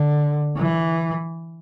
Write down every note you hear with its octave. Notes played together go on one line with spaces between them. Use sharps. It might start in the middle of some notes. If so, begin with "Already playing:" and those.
Already playing: D3
E3